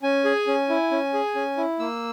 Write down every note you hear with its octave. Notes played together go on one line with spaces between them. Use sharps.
C#4 G#5
G#4
C#4
E4
C#4
G#4
C#4
E4
A#3 E6